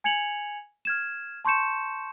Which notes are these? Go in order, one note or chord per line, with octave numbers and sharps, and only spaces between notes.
G#5 G#6 C#7 F7 F#7
F6 G#6 E7
A5 C6 C#6 G6 C#7 E7